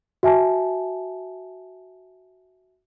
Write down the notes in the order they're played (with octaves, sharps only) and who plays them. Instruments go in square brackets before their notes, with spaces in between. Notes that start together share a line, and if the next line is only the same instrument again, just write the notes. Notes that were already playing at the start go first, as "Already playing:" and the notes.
[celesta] F#4 E5 G#5 A5